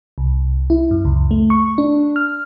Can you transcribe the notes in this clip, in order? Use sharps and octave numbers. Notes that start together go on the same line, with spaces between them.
C2
E4
F#2
C#2
A3
C#6
D4
F6